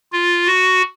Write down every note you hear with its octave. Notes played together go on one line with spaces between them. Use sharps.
F4
F#4